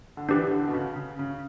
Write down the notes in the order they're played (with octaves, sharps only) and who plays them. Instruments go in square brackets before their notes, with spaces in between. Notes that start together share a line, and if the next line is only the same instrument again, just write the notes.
[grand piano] D3
[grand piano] E3 [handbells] D4 G4 B4
[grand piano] D3
B2
C#3
C#3
C#3